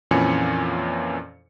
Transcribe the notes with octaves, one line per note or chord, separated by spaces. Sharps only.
F2 A#2 E3 C#4 G#5 C#7